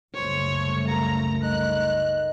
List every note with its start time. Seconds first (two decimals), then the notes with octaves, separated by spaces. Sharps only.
0.14 F#1 C2 A3 C5 C#5 C6
0.87 A#3 A#4 A#5
1.43 D#4 F#6